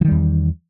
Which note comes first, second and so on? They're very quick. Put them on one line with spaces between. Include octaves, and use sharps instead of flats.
F3 D#3 G3 E2